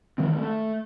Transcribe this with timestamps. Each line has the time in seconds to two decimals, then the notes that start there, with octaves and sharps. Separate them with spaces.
0.18 D#3 E3 G#3 C4
0.37 A3